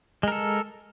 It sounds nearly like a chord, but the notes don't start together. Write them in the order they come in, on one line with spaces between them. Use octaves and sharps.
G#3 A#4 A4